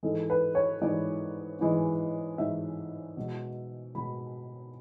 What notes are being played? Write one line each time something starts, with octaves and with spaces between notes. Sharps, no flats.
G#2 E3 G#3 A4
B4
C#5
G#2 E3 G#3 D5
G#2 E3 G#3
G#2 E3 G#3 E5
B2 G#3
B2 G#3 B5